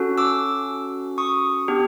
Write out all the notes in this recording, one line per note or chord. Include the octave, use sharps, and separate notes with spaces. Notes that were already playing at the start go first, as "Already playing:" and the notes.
Already playing: C#4 F#4 A4
D6 E6
C#6 D#6
B3 D4 G4